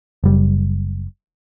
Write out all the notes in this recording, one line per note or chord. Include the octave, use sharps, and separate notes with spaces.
F#1 G3